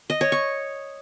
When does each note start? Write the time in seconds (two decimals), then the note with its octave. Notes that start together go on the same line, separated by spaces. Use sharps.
0.10 D#5
0.21 C#5
0.32 C#6